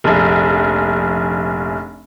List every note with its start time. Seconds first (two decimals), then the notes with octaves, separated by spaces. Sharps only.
0.04 F1 A#1